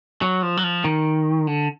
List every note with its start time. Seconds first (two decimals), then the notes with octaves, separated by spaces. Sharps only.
0.22 F#3
0.43 F3
0.57 F#3
0.64 F3
0.84 D#3
1.47 D3